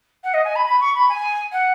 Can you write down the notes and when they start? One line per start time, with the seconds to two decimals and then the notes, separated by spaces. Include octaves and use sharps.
0.24 F#5
0.34 D#5
0.45 G#5
0.55 B5
0.66 B5
0.80 C#6
0.95 B5
1.09 G#5
1.52 F#5